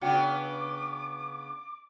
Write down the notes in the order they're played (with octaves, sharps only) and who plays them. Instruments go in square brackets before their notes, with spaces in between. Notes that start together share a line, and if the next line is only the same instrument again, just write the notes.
[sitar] C#3 B3 D4 [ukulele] F#4 F#5 G5 [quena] D6